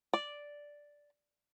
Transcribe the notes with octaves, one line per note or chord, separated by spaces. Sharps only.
D5